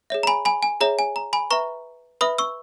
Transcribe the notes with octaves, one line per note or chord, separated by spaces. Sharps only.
G#4 C#5 E5
A#5
G#5 B5
G#5 B5
G#5
G#4 C#5 E5 A#5
G#5
A#5
G#5 B5
B4 E5 A#5 C#6
B4 E5 B5 D#6
C#6 E6